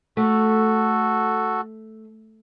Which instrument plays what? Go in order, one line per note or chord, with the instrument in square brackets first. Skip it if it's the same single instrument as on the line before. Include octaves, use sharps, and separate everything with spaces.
[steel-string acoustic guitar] A3 [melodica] F#4 A4